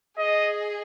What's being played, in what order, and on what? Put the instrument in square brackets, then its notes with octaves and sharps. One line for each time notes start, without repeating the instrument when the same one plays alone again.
[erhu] G#4 [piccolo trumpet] D#5